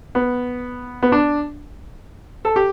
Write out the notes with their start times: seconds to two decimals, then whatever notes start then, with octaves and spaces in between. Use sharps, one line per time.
0.15 B3
1.03 B3
1.12 D4
2.45 A4
2.56 G4